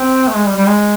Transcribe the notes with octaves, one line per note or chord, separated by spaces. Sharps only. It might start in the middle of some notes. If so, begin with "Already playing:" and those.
Already playing: C4
A3
G#3
G3
G3
G#3